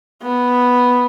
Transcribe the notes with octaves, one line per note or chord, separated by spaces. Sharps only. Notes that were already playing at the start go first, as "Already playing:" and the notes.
B3